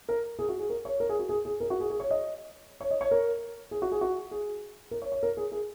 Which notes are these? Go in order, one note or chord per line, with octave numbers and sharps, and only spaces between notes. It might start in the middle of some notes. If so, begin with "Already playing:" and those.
A#4
G#4
F#4
G#4
A#4
C#5
A#4
G#4
F#4
G#4
G#4
A#4
F#4
G#4
G#4
C#5
D#5
C#5
D#5
C#5
A#4
G#4
F#4
G#4
F#4
G#4
A#4
C#5
C#5
A#4
G#4
G#4